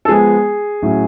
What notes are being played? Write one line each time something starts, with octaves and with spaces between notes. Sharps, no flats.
A4
F3 G#3 B3 G#4
A2 F#3 C#4